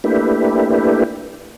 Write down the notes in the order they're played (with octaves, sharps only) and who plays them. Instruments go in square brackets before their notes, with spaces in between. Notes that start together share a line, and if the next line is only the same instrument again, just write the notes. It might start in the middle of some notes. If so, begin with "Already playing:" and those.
[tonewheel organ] A3 A#3 D4 E4 G4 B4